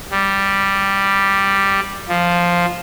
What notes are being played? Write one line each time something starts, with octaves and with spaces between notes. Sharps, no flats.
G3
F3